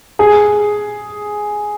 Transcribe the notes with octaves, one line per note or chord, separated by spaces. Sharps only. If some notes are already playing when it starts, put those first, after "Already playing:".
G#4